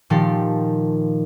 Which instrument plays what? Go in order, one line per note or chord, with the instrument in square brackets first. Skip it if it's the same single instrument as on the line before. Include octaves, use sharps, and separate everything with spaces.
[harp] A#2 D#3 F3 G4 A4 C7